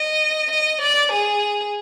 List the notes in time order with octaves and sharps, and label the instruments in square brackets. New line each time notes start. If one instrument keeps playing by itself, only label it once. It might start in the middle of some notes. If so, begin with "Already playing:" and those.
Already playing: [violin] D#5
D#5
D5
G#4